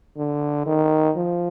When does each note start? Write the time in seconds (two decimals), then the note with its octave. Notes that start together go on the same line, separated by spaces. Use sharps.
0.17 D3
0.66 D#3
1.16 F3